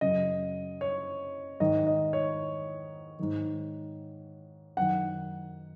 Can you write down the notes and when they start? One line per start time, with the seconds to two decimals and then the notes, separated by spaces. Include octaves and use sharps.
0.01 F#2 C#3 D#5
0.81 C#5
1.60 G#2 D#3 D#5
1.87 D#5
2.13 C#5
3.19 G#2 D#3
4.77 F#2 D#3 F#5